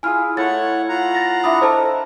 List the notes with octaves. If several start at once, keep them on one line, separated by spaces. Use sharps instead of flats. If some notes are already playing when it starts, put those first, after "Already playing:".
E4 F4 G#4 G#5 F6
A3 E4 C#5 F#5 A6
F4 F#5 A#5
A6 A#6
D4 E4 E5 B5 D#6
A4 A#4 C5 D#5 A5 B5